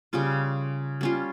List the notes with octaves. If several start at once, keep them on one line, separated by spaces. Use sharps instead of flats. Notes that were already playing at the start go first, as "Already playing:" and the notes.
C#3 G3 C#4 F4
G3 C#4 F4